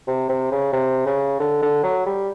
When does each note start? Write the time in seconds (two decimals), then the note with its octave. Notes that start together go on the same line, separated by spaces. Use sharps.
0.07 C3
0.29 C3
0.52 C#3
0.73 C3
1.06 C#3
1.40 D3
1.63 D3
1.84 F#3
2.06 G3